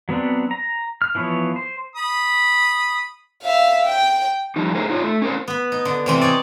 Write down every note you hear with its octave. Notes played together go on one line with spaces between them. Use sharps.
F#3 B3 C4 D4
A#5
F6
E3 F3 B3 C#5
C5
B5 D#6
E5 F5
G5
F3 G3 D#4
A3 G#4 A#4 C5
D#4 F4 C#5
A3
C#4 A#4 C5
B3 B5
D#4
D3
C3 E3 C4
D#4 C#5 D5